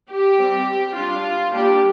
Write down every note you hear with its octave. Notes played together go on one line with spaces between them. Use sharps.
G4
G3 C4
G3 D4 F4
G3 A#3 D4 G4